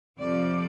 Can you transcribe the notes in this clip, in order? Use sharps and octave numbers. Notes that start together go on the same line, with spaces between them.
F2 C3 F3 D5